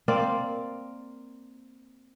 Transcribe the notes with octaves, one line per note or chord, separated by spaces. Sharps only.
A#3 C4 D5 F5